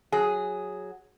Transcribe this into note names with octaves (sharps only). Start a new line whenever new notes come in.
F#3 G#4